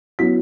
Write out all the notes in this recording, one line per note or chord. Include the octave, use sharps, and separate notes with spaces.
F#3 B3 E4 B6